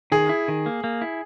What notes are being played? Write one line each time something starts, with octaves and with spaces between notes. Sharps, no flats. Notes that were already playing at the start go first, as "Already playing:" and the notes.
D#3 G#4
E4
D#3
A#3
A#3
E4